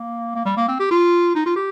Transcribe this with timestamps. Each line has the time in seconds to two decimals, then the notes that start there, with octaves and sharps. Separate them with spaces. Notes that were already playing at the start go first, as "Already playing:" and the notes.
Already playing: A#3
0.35 A#3
0.45 G3
0.57 A#3
0.68 C4
0.80 G4
0.91 F4
1.35 D#4
1.46 F4
1.56 G4